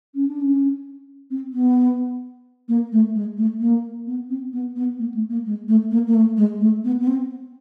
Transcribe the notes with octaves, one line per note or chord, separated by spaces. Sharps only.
C#4
D4
C#4
C4
B3
A#3
A3
G#3
A3
A#3
B3
C4
B3
B3
A#3
A3
A#3
G#3
A3
A#3
A#3
A3
G#3
A3
B3
B3
C4